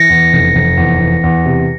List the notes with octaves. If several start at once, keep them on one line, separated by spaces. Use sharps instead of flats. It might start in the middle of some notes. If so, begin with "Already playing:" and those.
Already playing: E3 A#6 C#7
E2
F1
F1
E2
E2
E2
C3